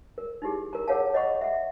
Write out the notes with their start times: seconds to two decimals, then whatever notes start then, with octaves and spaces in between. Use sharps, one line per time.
0.18 A#4
0.42 D#4 E4 G4 G#4
0.73 A#4 A#5
0.88 G#4 A#4 C#5 F5 F#5 A5
1.14 C#5 D#5 F#5 B5 C#6
1.41 E5 F#5